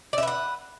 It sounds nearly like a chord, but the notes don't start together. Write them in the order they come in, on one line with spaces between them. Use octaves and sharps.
D5 E5 B4 F#5